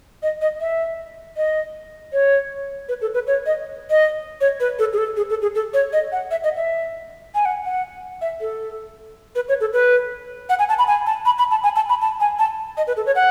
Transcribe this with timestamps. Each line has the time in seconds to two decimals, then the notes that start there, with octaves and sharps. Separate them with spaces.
0.22 D#5
0.41 D#5
0.60 E5
1.37 D#5
2.13 C#5
2.88 B4
3.01 A4
3.14 B4
3.27 C#5
3.46 D#5
3.90 D#5
4.41 C#5
4.60 B4
4.79 A4
4.93 G#4
4.98 A4
5.17 G#4
5.30 A4
5.42 G#4
5.55 A4
5.74 C#5
5.93 D#5
6.12 F#5
6.31 E5
6.44 D#5
6.57 E5
7.35 G#5
7.45 F#5
7.65 F#5
8.21 E5
8.41 A4
9.35 B4
9.49 C#5
9.60 A4
9.73 B4
10.49 F#5
10.59 G#5
10.69 A5
10.78 B5
10.87 G#5
11.06 A5
11.26 B5
11.38 B5
11.51 A5
11.63 G#5
11.76 A5
11.89 B5
12.01 A5
12.20 G#5
12.39 A5
12.77 D#5
12.87 B4
12.96 A4
13.06 C#5
13.15 F#5